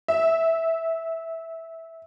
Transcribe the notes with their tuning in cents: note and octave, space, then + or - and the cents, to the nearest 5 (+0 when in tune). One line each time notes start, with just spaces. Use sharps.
E5 -10